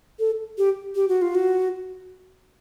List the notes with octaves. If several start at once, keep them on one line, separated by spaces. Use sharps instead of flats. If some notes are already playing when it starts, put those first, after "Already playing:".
A4
G4
G4
F#4
F4
F#4